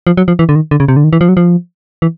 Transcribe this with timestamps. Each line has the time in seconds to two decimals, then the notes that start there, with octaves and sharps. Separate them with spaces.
0.07 F3
0.17 F#3
0.28 F3
0.39 E3
0.49 D3
0.56 D#3
0.71 D3
0.80 C#3
0.88 C3
0.96 D3
1.04 D#3
1.13 E3
1.21 F3
1.29 F#3
1.37 F3
2.02 E3